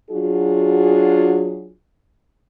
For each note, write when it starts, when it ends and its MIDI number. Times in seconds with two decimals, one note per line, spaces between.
0.10 1.72 54
0.10 1.72 62
0.10 1.72 65
0.10 1.72 66
0.10 1.72 68